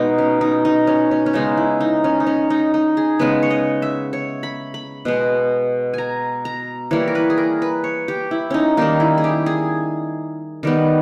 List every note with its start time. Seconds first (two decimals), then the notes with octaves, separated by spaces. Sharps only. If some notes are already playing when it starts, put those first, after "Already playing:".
Already playing: B2 G#3 B3 D#4
0.18 C#4
0.41 D#4
0.65 D#4
0.87 C#4
1.11 C#4
1.26 C#4
1.33 C#3 G#3 B3 D#4
1.57 E4
1.80 D#4
2.04 C#4
2.20 D#4
2.27 C#4
2.50 D#4
2.74 D#4
2.97 G#4
3.19 C#3 G#3 B3 B4
3.43 C#5
3.50 D#5
3.82 E5
4.13 C#5
4.43 B5
4.74 B5
5.05 B2 G#3 B3
5.94 G#5 A#5
6.45 A#5
6.91 E3 G3 A#3 C#5
7.08 A#4
7.15 B4
7.30 G#4
7.38 A#4
7.62 B4
7.84 C#5
8.08 G4
8.31 E4
8.50 C#4 D#4
8.77 D#3 G3 A#3 D#4
9.00 E4
9.18 G#4
9.24 G4
9.46 G#4
10.63 D#3 G3 B3